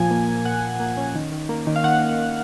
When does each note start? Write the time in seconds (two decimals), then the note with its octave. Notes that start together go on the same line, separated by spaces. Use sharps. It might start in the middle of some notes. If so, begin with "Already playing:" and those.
Already playing: A#2 F3 G#5
0.11 A#3
0.28 A#3
0.45 A#2 F#5
0.62 F3
0.80 A#3
0.97 C#4
1.15 D#3
1.32 D#3
1.49 A#3
1.67 D#3
1.76 F5
1.84 D#3 F#5
2.01 D#3
2.18 D#3